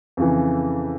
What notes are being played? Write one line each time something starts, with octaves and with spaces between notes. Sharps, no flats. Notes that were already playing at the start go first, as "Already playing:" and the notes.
F2 C#3 E3